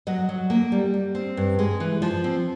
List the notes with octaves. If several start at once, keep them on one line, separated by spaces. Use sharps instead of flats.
F#3 D#5
F#3
A#3
G3
G3
C4
G2
G#3
E3
F3
C4